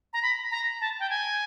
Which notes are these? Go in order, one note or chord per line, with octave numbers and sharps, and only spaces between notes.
A#5
B5
A#5
A5
G5
G#5